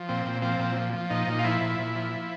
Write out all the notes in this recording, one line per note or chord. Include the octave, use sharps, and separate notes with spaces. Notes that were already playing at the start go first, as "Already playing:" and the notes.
Already playing: F3
A#2 C4
A#2
F3 C4
A#2
F3
F3
A#2 D#4
A#2
F4
F3 E4
A#2
A#2
F3
F3